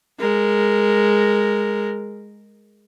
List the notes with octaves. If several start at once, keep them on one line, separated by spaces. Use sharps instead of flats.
G#3 A#4